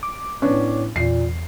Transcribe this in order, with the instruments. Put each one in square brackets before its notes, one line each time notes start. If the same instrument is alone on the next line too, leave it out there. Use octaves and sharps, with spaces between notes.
[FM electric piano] D6
[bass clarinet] A2 [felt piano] B3 C#4 D4
[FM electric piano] E2 [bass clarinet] A#2 [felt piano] C7